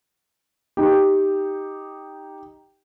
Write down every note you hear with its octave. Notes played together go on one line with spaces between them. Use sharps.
D#4 G4